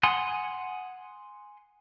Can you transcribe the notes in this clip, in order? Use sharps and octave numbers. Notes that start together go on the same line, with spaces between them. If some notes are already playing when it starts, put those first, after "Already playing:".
F#5 G#5 C6 D#6